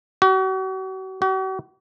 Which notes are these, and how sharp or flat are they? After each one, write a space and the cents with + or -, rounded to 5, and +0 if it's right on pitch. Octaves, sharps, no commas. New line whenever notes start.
F#4 +40
F#4 +45